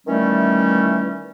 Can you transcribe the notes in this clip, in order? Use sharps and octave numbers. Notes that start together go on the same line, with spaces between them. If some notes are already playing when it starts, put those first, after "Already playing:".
D#3 E3 G3 A3 C#4